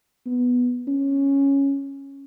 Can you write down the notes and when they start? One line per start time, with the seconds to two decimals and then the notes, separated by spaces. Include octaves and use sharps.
0.26 B3
0.88 C#4